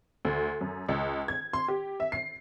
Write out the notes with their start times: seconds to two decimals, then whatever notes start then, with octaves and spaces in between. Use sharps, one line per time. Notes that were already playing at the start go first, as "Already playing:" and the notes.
0.25 D2
0.61 F#2
0.89 C#2
1.28 G#6
1.53 C6
1.68 G4
2.00 E5
2.12 C7